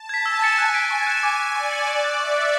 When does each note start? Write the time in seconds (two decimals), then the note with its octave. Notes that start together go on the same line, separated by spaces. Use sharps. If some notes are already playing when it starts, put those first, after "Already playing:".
Already playing: A5
0.09 G#6 B6
0.26 G#5 E6
0.42 A6 C#7 E7
0.58 F#6
0.74 B6 D7
0.90 G#5 C#6
1.07 F#6 C#7 E7
1.23 D6
1.39 F#6 B6 E7
1.55 D5 C#6
1.71 G#6 C#7 F#7
1.87 C#6
2.04 F#6 A6
2.20 E5 C#6
2.36 F#6 A6